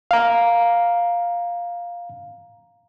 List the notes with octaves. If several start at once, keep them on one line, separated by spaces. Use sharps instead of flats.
F5 A#5